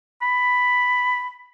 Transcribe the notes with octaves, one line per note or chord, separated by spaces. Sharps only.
B5